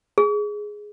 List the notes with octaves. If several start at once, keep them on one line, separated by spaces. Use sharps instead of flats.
G#4